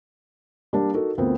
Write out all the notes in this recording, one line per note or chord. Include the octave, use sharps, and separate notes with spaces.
G3 A#3 D4 G4
D#4 F#4 A4 A#4
D2 B3 C4 F4 A#4